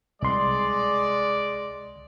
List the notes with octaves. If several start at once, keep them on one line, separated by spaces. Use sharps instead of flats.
C2 G#3 D5 C6